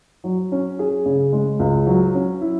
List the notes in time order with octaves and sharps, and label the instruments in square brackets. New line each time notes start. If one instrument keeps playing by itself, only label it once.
[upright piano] F#3
C#4
G#4
C#3
G#3
C#2
F#3
C#4
E4